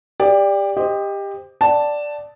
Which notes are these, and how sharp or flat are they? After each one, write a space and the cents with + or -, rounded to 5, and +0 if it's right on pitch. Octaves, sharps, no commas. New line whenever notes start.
G4 +25 D5 +0
G4 +20 C5 +0 D#5 +0
D5 +0 F#5 +45 A5 +0